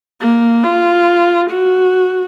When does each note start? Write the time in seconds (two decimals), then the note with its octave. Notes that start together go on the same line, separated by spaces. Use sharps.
0.21 A#3
0.63 F4
1.50 F#4